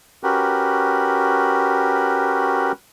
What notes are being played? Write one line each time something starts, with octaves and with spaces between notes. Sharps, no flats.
C#4 F#4 G4 A#4 B4